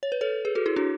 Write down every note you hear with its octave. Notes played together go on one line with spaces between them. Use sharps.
C#5
B4
A4 C#5
G#4 B4
F#4 A4
E4 G#4
D4 F#4